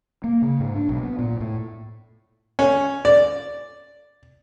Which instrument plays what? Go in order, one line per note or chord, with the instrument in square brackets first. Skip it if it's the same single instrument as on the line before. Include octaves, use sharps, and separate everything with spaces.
[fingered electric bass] A#3
C#3
G#2
D4
B1
B3
A#2
A2
[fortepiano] C#4
D5